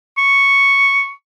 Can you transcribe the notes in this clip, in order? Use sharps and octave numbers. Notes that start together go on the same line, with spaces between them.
C#6